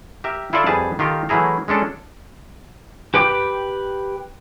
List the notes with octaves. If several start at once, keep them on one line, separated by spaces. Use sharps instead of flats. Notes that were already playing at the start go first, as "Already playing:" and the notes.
G4 A#4 E5
E4 F4 A4 D5 E5
F2 G3 G#4 B4 A5
D#3 F4 G4 A4 A#4
E3 F#3 A3 E4 G#4 A#4
G#3 C#4 D4 A4
G4 B4 G5 D6